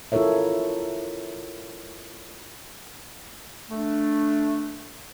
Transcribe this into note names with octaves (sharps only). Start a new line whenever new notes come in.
E4 F4 A4 A#4 C#5 E5
A3 D4